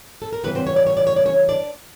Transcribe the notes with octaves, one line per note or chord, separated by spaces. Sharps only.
A4
A#4
F#2 C#3 E3 G3 B3 B4
C4 C5
C#5
D5
C#5
D5
C#5
D5
C#4 C#5
D4 D5